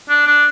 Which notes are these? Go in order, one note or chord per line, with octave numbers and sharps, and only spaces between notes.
D4
D4